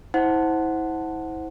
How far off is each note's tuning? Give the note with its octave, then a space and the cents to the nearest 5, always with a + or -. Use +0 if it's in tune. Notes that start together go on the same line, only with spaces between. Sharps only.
E4 -30 C5 +0 F#5 +0